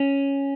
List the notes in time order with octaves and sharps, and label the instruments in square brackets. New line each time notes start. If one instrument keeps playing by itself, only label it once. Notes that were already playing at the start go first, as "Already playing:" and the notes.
Already playing: [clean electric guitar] C#4